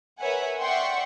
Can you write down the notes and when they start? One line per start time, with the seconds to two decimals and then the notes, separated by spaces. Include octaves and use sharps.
0.21 A#4 B4 C#5 E5 F#5 G#5
0.59 D5 E5 F#5 G5 C6 C#6